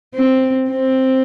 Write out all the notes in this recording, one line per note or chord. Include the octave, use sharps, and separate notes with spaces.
C4
C4